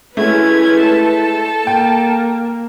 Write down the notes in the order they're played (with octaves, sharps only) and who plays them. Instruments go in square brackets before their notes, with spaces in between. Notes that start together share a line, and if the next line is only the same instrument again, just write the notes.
[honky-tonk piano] F#3 G#3 A3 [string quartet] C#4 G#6 [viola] E4 B4
[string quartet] A4 A5
[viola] A#3 [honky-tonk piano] G5